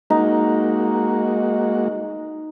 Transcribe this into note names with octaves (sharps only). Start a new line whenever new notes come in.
G#3 A#3 D#4 F#4